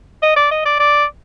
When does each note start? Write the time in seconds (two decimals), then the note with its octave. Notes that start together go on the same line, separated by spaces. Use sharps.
0.23 D#5
0.37 D5
0.52 D#5
0.66 D5
0.80 D5